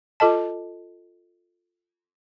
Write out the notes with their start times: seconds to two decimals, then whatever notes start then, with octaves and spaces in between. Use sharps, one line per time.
0.20 F4 A4 D#5 A5